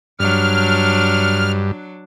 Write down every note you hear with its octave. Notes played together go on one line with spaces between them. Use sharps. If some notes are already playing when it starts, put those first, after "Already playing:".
G2 F#3 D4 F6